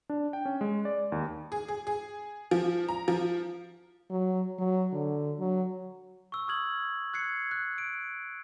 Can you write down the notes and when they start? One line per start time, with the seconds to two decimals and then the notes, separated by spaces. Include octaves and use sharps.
0.10 D4
0.33 G5
0.45 C#4
0.61 G#3
0.85 D5
1.12 D#2
1.52 G#4
1.68 G#4
1.87 G#4
2.51 F3
2.89 A#5
3.08 F3
4.10 F#3
4.58 F#3
4.92 D3
5.39 F#3
6.32 C#6 E6
6.48 D#6 F6 G#6 F#7
7.14 F#6 G#6 C7 C#7
7.51 F#6
7.78 D7